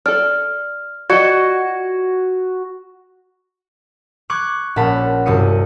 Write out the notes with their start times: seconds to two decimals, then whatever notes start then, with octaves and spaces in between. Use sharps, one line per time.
0.06 A4 D5 F6
1.10 F#4 D5 D#5 G#6 C#7
4.30 C#6 D6 F#6 G#6
4.76 A#1 A#2 C#4 F#5 A5 B5
5.26 C2 G2 C3 F#4 D#6 C#7